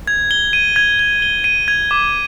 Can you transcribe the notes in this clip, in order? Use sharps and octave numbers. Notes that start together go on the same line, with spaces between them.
G#6
G7
D#7
G#6
G#6
G7
D#7
G#6
D6